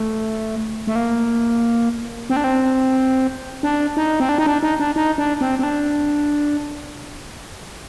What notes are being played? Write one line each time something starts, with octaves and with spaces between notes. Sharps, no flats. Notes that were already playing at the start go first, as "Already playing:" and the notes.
Already playing: A3
A3
A#3
C4
D4
C4
D4
D#4
C4
D4
D#4
D4
D#4
D4
D#4
D4
C4
C4
D4